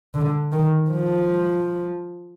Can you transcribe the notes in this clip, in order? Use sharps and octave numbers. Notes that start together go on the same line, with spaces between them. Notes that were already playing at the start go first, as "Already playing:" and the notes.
D3
D#3
F3